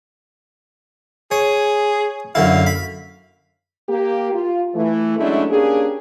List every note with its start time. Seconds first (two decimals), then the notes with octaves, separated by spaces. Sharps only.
1.31 G#4 C#5
2.35 F#2 D3 E4 F5
2.66 B5
3.88 A#3 G4
4.32 F4
4.75 E3 A3
5.18 F#3 G#3 A3 C#4 D4 E4
5.50 A#3 C#4 D4 G4 G#4